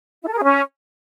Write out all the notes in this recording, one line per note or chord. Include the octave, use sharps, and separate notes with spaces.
E4
A4
A#4
G#4
C#4